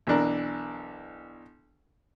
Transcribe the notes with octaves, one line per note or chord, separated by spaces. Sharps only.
B1 E3 D4 A#4